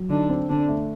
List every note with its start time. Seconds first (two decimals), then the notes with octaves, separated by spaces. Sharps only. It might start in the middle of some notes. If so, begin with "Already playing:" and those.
Already playing: F#3
0.10 D3 D4 D#4
0.29 C4
0.49 D3 C4 D4
0.69 A3